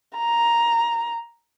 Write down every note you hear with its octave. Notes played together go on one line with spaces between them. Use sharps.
A#5